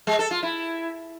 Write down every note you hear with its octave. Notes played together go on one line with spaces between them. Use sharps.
G#3
A4
F4
E4